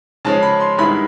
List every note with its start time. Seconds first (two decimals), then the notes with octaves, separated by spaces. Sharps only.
0.25 C#3 F3 G#3 C#4 A5
0.43 B5
0.60 C6
0.78 G2 D#3 G#3 B3 E4 B5